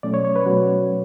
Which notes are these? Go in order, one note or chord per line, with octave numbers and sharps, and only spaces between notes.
B2 F#3 A3 C#4 D5
C#5
C#5
B4
B2 F#3 A3 C#4 F#4